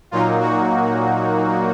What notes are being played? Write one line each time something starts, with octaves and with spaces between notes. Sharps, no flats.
A#2 F#3 A#3 D#4 F4
F#4